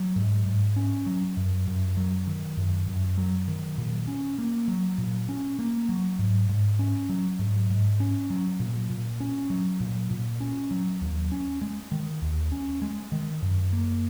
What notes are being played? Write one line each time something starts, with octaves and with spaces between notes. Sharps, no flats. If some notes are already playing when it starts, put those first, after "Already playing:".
Already playing: F#3
G#2
G#2
C#4
F#3
F#2
F#2
F#3
D#3
F#2
F#2
F#3
D#3
A#2
C#4
A#3
F#3
A#2
C#4
A#3
F#3
G#2
G#2
C#4
F#3
G#2
G#2
C#4
F#3
A#2
A#2
C#4
F#3
A#2
A#2
C#4
F#3
D#2
C#4
G#3
D#3
D#2
C#4
G#3
D#3
F#2
A#3